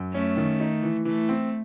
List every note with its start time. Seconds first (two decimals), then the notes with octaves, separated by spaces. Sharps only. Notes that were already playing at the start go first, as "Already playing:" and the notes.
Already playing: F#2
0.13 A3 C#4
0.37 D#3
0.60 D#4
0.83 E3
1.05 E3 A3
1.29 C4